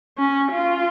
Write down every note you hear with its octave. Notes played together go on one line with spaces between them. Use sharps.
C#4
F4